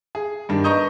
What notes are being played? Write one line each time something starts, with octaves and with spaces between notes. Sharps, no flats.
G#4
G2 D#3 D4
B4 D#5 A#5 C#6 D#6 G6